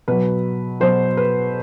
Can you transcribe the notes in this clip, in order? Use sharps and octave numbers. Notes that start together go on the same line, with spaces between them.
B2 F#3 B4
B2 F#3 C5
B4